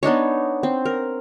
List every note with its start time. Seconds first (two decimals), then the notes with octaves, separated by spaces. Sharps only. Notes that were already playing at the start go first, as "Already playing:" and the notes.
0.03 B3 D4 D#4 C#5
0.63 C4
0.85 A#4